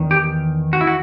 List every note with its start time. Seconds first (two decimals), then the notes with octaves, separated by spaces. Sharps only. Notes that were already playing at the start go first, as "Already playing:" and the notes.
Already playing: E2 D#3
0.11 G4
0.73 F#4
0.81 E4
0.87 F#4